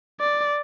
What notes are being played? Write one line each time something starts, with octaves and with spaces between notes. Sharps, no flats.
D5